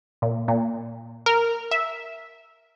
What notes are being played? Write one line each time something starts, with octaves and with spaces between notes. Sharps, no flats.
A#2
A#2
A#4
E5